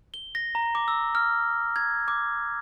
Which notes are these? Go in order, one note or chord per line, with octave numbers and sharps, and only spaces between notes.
G7
A#6
A#5
D6
E6
F6
G#6
D6